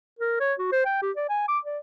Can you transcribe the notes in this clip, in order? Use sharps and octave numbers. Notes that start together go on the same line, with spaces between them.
A#4
C#5
F#4
C5
G5
G4
D5
G#5
D6
D5